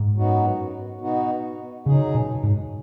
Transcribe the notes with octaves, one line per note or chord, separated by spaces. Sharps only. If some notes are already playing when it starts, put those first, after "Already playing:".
Already playing: G#2
F#2 F#3 B3 D#4 F#4
B2 B3 D#4 F#4
C#3 F#3 D#4 G#4
B2
G#2